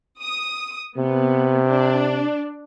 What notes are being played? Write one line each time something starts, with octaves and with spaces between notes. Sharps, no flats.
D#6
C3 B3
D4